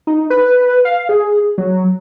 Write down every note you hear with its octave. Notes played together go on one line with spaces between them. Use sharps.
D#4
B4
F5
G#4
F#3